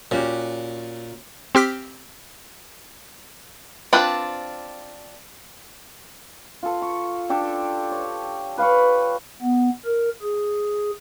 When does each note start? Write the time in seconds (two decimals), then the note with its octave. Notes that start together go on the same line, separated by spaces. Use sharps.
0.11 A#2 C#4 F#4 G4
1.55 C4 G4 F6 B6
3.93 C4 D4 F4 B4
6.63 F4 A4
6.82 C#6
7.30 D4 G4 A4 D5
7.91 C#5
8.58 B4 F5 B5 C#6
9.42 B3
9.85 A#4
10.22 G#4